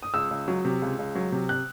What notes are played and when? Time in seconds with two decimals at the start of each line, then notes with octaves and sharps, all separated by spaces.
0.03 D#6
0.14 C#2 E6
0.31 C#2
0.48 F#3
0.65 C3
0.82 C#2
0.99 C#2
1.15 F#3
1.32 C3
1.49 F#6